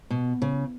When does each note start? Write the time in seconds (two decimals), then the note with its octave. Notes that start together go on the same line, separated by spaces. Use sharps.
0.10 B2
0.42 C#3